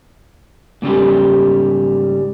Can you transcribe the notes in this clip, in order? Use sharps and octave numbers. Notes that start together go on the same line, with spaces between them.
G#2 C#3 G3 G4